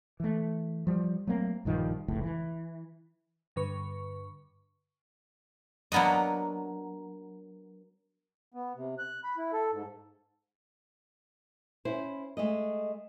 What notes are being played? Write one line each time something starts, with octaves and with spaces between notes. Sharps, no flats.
E3 A3
F3 G3
F#3 A3 A#3 C4
A#1 G2 D#3 F3
F1 C#2 A2
E3
G2 D3 B4 C#6
F#3 A#3 B3 D4 D#5
B3
C3
F#6
B5
E4
A4
G#2
C#4 E4 C5
G#3 A3 D#5